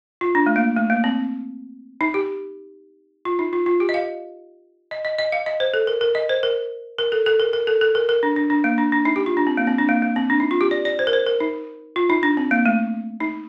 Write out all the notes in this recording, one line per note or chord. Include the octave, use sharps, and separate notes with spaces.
F4
D4
A3
A#3
A3
A#3
C4
D#4
G4
F4
D#4
F4
F4
G4
D#5
F5
D#5
D#5
D#5
F5
D#5
C5
A4
A#4
A#4
D#5
C5
A#4
A#4
A4
A4
A#4
A#4
A4
A4
A#4
A#4
D4
D4
D4
A#3
D4
D4
D#4
G4
F4
D4
C4
A#3
C4
D4
A#3
A#3
C4
D4
D#4
F4
G4
D5
D5
C5
A#4
C5
A#4
D#4
F4
D#4
D4
C4
A#3
A3
D#4